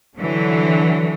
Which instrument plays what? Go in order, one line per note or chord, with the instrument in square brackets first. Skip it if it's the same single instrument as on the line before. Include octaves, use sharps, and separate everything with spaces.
[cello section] D3 E3 F#3